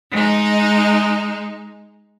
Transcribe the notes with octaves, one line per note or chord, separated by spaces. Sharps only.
G#3 D#4